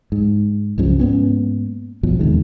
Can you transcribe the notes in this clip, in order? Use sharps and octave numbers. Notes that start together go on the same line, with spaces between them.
G#2
C2 G2 C#3 F3
G#2 A#3 B3 C#4
A#1 G2 B2 F3
E2 C3 D#3 G#3